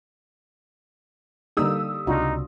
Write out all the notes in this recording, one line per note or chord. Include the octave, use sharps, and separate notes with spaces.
D3 G3 A#3 D#4 D#6 E6
C#2 C3 D4 D#4 F4 F#4